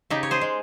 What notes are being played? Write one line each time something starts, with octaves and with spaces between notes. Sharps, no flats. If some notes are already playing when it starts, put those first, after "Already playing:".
C#3 D#4 G4
C#5
G#4 C5
G#3